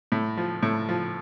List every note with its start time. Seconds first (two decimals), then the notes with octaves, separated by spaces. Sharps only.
0.12 A2
0.37 F3
0.63 A2
0.89 F3